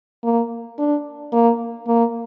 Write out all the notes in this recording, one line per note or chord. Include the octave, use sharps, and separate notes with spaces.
A#3
D4
A#3
A#3